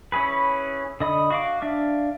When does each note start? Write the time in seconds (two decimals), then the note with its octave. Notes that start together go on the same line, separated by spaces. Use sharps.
0.12 C#4 E4 G#4 B4
1.00 D3 D#5 B5 D#6
1.31 F#4 F5 D6
1.62 D4 E5 F5